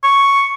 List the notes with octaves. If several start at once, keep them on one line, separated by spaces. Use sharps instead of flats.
C#6